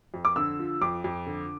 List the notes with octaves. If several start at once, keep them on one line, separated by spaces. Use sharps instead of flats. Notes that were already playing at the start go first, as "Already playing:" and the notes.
F2
D6
D3 E6
F3
F2 D6
F2
D3